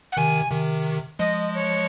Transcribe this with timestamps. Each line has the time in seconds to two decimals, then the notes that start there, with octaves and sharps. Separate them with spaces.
0.12 F#5
0.17 C3 D#3 G#5
0.51 C3 D#3
1.19 F3 G#3 D#5
1.54 C#5